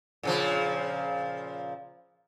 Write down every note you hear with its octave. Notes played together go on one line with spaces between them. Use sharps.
A#2 C#3 F3